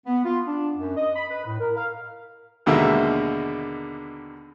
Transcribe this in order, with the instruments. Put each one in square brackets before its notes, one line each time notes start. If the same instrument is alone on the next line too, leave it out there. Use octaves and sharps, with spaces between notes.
[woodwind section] B3
F4
D4
F#2
D#5
B5
B4
A2
A#4
F5
[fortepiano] D#2 B2 D3 G#3 A#3 E5